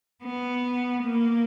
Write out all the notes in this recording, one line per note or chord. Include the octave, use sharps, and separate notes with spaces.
B3
A#3